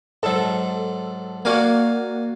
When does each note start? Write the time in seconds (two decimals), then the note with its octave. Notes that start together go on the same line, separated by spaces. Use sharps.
0.23 G#2 F#3 A4
1.45 A#3 F#4 D5 F5 G#5